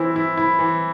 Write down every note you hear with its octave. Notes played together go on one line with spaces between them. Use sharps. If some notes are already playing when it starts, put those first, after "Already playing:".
Already playing: E3 C4 E4
E4
E4
E3